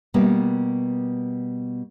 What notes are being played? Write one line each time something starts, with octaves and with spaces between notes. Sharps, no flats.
B2 G3 A#3 B3